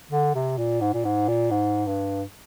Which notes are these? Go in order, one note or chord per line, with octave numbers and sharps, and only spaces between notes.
D3
C3
A#2
G#2
A#2
G#2
A#2
G#2
G2